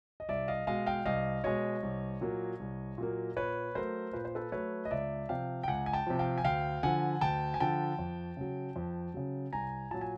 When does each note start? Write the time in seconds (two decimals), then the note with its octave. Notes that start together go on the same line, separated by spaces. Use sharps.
0.20 D#5
0.29 C2 D5 E5
0.48 D#5 F5
0.67 B2 G#3 D#5 F5
0.86 F5 G5
1.06 C2 D#5 F5
1.44 B2 G#3 C#5 D#5
1.83 C2
2.21 A#2 F#3 A#3
2.60 C2
2.98 A#2 F#3 A#3
3.36 A#2 B4 C#5
3.75 F#3 A3 A#4 C5
4.13 A#2 B4
4.25 C5
4.35 A4 B4
4.52 F#3 A3 B4 C#5
4.85 D#5
4.91 C#2 D5 E5
5.29 C3 F3 F5 G5
5.63 G5
5.68 C#2 F#5 G#5
5.86 G#5
5.93 G5 A5
6.07 C3 F3
6.19 F5 G5
6.38 G#5
6.45 D2 F5 G5
6.83 D3 F3 F#5 G#5
7.21 D2 G5 A5
7.54 G#5
7.60 D3 F3 G5 A5
7.99 F2
8.37 C#3 F#3
8.76 F2
9.14 C#3 F#3
9.53 C2 G#5 A#5
9.91 A#2 F#3 A5
10.01 G#5